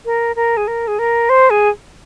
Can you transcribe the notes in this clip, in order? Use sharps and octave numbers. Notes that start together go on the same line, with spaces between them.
A#4
A#4
G#4
A#4
G#4
A#4
C5
G#4